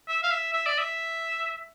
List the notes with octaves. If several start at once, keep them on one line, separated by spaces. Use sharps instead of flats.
E5
F5
E5
E5
D5
E5